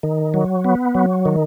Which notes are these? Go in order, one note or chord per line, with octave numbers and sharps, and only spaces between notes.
D#3
F#3
B3
F#3
D#3